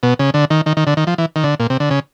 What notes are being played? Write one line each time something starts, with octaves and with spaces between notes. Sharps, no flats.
B2
C#3
D3
D#3
D#3
D#3
D3
D#3
F3
E3
D#3
D3
A#2
C3
D3
C#3